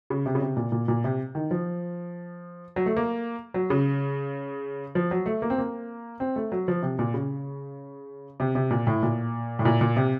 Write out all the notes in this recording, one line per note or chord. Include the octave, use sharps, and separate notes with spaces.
C#3
C3
C#3
C3
A#2
A#2
A#2
C3
D#3
F3
F#3
A3
A#3
F#3
C#3
F3
F#3
A3
A#3
C4
A#3
C4
A3
F#3
F3
C3
A#2
C#3
C3
C3
A#2
A2
A#2
A2
A#2
A#2
C3